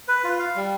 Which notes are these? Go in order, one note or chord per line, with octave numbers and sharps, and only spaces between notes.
B4
F4
F5
G3